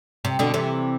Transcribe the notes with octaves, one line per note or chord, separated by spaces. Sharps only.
C3
B2 D3
C3 E3